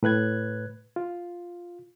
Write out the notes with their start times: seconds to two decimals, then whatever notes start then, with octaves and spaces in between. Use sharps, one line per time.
0.03 A2 B4 F#6 G#6
0.96 F4